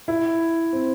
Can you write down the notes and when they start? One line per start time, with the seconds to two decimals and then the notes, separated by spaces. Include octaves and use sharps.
0.08 E4
0.73 C4